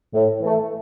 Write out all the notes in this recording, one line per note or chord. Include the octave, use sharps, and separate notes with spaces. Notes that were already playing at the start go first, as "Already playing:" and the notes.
A2
E3 A3